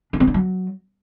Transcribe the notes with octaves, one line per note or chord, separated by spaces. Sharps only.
D4
C4
D4
F#3